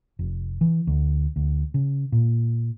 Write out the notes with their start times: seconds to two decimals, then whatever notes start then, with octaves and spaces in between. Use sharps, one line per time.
0.19 F1
0.61 E3
0.87 D2
1.36 D2
1.74 C#3
2.12 A#2